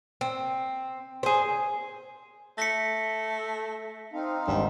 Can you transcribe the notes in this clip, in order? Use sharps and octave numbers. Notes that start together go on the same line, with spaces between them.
C4
G#4 C5
A3 A#6 B6 C#7
C4 D#4 F5
G#1 G2